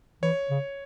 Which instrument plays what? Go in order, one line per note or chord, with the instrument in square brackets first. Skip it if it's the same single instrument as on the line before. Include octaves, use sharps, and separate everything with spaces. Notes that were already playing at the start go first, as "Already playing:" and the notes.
[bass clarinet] E3 [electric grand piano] C#5
[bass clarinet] C#3